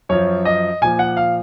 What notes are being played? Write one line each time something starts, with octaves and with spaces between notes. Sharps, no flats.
F#2 F3 C#5
D#5
A#2 F3 G#5
F#5
F5